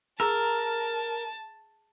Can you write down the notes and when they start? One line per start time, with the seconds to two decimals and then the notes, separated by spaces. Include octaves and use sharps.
0.20 G#4 A#4 A5 A#5 E6